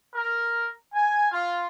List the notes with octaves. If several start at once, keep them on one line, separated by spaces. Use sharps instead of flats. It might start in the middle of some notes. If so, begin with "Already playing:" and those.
A#4
G#5
F4